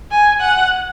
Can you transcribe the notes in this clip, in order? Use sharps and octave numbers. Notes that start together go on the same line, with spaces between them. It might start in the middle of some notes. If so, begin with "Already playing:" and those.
G#5
F#5